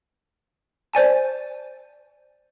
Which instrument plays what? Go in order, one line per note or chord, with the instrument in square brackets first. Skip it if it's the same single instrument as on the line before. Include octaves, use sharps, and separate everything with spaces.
[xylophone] C5 D5 G#5 A5